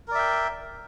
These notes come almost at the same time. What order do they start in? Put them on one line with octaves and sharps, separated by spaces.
A#4 D5 E5 G5